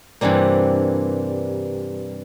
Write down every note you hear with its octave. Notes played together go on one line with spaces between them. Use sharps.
G2 C3 E3 G3 A#3